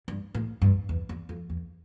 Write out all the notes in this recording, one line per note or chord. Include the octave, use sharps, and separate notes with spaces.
G2
A2
G2
E2
E2
F2
E2